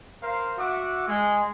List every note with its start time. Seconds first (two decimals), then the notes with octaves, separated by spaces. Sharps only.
0.22 A#4 C5 F5
0.58 F#4 E5 F#5 D6
1.07 G#3